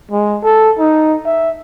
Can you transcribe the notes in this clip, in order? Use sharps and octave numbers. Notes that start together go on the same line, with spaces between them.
G#3
A4
D#4
E5